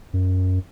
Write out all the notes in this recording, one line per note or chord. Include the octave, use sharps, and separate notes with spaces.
F#2